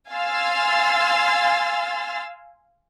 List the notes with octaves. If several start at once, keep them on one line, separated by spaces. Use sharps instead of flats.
F5 G#5 C6 E6 F6 A6